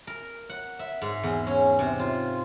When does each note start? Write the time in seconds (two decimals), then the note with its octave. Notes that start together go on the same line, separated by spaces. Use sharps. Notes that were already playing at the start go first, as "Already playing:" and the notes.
0.07 A#4
0.49 F#5
0.79 E5
1.02 G#2
1.23 E2
1.47 C#4
1.79 C3
2.00 F4